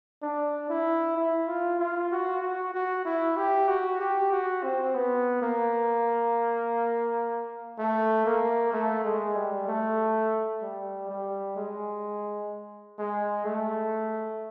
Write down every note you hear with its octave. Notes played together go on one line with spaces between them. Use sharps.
D4
E4
E4
F4
F4
F#4
F#4
F#4
E4
G4
F#4
G4
F#4
C4
B3
A#3
A3
A#3
A3
G#3
G3
A3
G3
G3
G#3
G#3
A3